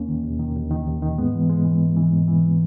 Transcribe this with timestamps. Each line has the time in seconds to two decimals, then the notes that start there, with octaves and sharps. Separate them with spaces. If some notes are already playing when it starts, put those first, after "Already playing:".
Already playing: D#2 A#3 C#4
0.08 D#3
0.24 D#2
0.40 D#3
0.56 D#2
0.71 D#3
0.87 D#2
1.03 D#3
1.18 G#2 G#3 B3
1.35 E3
1.50 G#2 G#3
1.65 E3
1.81 G#2
1.96 E3
2.12 G#2
2.28 E3